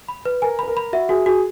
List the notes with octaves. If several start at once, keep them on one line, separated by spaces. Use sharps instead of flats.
B5
B4
A#4 G#5
B4 B5
A#4
B5
F#4 E5
F#4 G#4
F#4 G#4